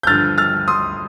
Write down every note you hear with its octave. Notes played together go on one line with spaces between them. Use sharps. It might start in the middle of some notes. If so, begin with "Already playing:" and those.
G6
G2 D3 F3 F6 A6
F6 A6
C6 D#6